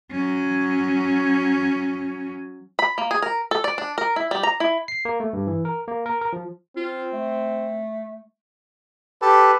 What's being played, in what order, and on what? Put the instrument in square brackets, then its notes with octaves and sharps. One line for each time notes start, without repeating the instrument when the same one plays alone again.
[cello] F#3 C#4
[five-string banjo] B5
A#3
G#4
A#4
A4
D5
D4
A#4
E4
G3
A#5
E4
[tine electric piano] C7
A#3
A3
G2
E3
A#4
A#3
A#4
A#4
F3
[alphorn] C4 [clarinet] F4
[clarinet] A3
[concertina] G4 A4 A5 [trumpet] B4